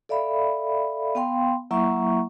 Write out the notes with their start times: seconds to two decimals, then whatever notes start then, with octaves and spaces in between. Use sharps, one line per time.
0.09 A4 D5 E5 F5 B5
1.15 B3 F5 G5 C6
1.71 F#3 A#3 E4 E5 A#5 C#6